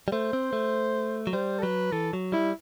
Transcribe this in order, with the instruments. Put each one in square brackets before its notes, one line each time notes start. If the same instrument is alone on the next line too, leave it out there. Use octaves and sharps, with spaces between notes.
[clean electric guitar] G3
[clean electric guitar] A3 [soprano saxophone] C5
[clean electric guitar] C4
A3
F#3
[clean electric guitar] G3 [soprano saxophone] C5
[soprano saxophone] A4
[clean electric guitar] F#3 [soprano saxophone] B4
[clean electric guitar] E3 [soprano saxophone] A4
[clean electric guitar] F#3
[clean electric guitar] G3 [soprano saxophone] E4